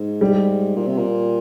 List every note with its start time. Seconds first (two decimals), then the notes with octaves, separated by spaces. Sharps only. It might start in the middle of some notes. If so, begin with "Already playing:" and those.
Already playing: G#2
0.21 G3
0.76 A#2
0.87 C3
0.98 A#2